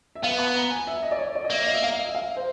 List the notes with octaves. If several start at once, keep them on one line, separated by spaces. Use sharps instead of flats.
E5
B3 F5
B5
A#5
G#5
E5
D#5
D5
C#5
D5
D#5
A#3 E5
D#5
E5
F5
D#5
E5
F5
C5